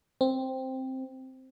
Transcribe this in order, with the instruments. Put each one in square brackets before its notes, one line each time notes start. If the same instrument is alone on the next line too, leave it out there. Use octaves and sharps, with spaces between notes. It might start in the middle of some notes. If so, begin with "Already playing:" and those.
[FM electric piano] C4